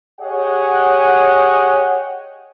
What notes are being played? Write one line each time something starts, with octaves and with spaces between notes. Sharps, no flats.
G4 G#4 C#5 D#5 F#5